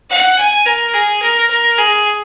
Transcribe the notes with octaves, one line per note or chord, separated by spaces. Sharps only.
F#5
G#5
A#4
G#4
A#4
A#4
G#4